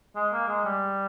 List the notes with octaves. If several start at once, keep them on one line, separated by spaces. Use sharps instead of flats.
G#3
A#3
G#3
G3